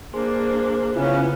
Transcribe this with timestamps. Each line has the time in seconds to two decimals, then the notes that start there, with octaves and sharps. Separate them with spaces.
0.14 A#3 D4 G#4 C5
0.96 C#3 B3 C#4 E4 F4